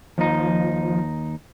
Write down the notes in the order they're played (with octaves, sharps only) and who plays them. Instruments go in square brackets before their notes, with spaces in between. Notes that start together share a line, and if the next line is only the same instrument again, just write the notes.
[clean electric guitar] D#2 D#4 [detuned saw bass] F3